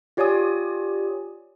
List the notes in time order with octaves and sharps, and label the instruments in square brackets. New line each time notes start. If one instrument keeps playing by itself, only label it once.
[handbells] F4 G4 C#5 D5 G#5 D#6